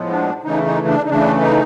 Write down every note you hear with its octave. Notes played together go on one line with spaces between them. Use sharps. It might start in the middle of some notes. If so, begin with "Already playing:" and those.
Already playing: A2 F3 G#3 B3
D4
C#3 E3 A3 D#4
D#4
D4
D#4
C#3 E3 A3 D4
D#4